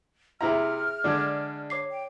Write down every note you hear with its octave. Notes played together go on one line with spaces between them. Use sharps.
C3 E4 G#4 E5 A#5 F6
D3 G#3 D4 D5 G#6
C#5 D6 C7
G5